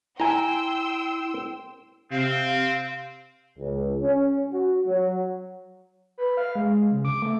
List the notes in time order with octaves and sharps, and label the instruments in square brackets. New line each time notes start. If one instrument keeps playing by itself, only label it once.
[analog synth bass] E4 [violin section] G5 C6 E6 [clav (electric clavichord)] G#5 A#5
[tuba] C3 [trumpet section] C4 [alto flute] F5
[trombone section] C#2
C#4
F#4
F#3
[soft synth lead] B4
F5
G#3
C#3
D6
A3